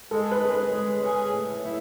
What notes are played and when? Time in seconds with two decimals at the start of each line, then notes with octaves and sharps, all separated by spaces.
0.11 G#3 A4
0.31 B4
0.41 C#4 G#4
0.51 B4
0.71 G#3
1.01 C#4 G#4
1.32 A2
1.61 F#3 A3 E4 G#4